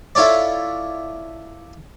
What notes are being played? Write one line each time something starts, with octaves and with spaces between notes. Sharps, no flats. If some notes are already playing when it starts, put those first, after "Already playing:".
E4 F4 A4 C#5 D5